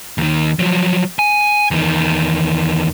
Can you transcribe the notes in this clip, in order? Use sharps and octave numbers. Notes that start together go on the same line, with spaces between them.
D#2 D#3
F3 F#3
G#5
E2 D#3